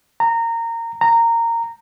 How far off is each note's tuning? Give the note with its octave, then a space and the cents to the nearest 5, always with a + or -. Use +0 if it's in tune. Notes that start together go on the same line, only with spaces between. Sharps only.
A#5 -20
A#5 -15